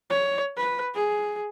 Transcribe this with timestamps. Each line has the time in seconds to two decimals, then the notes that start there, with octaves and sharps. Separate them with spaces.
0.10 C#5
0.57 B4
0.94 G#4